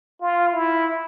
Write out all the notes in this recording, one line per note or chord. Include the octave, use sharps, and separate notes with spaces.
F4
E4